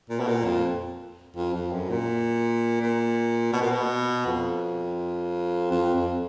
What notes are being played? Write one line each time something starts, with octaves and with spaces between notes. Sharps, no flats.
A#2
B2
A#2
F2
F2
F2
F#2
A#2
A#2
B2
A#2
B2
F2
F2
F2